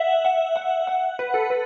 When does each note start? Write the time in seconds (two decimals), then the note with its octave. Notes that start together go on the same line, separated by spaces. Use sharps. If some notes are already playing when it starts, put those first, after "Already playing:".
Already playing: E5 F#5
0.25 F#5
0.56 F#5
0.87 F#5
1.19 B4
1.34 A4
1.50 B4